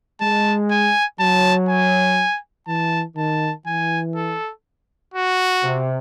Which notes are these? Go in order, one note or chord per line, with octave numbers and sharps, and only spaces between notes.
G#3 A5
G#5
F#3 A5
G#5
E3 A5
D#3 A5
E3 G#5
A4
F#4
C3